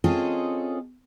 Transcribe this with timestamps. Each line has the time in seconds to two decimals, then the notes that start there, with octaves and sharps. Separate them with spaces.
0.04 C4 C#4 F4 G#4 A4 D#5